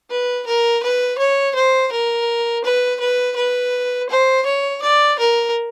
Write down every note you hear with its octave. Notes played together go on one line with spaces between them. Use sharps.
B4
A#4
B4
C#5
C5
A#4
B4
B4
B4
C5
C#5
D5
A#4